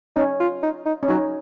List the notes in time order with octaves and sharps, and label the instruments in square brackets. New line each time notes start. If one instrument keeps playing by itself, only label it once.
[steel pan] C#4 [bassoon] D#4
[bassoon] F4
D#4
D#4
[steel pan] C#4
[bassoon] F#3 [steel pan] D#4